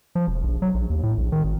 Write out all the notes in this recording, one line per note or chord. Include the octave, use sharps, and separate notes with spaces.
F3
E1
A#1
F#3
A#1
D#2
A2
A#1
D#3
G#1